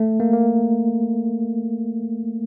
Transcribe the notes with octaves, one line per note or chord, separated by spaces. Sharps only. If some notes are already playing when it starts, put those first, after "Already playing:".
Already playing: A3
A#3
A#3